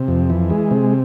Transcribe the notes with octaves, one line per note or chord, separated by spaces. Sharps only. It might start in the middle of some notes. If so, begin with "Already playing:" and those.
Already playing: C3
F2
E3
G#3
C3